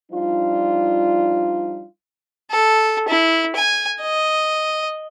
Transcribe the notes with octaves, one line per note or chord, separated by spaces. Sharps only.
F3 G3 D4 D#4 F4
A4
E4
G#5
D#5